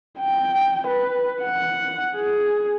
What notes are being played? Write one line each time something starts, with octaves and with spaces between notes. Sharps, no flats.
G5
B4
F#5
G#4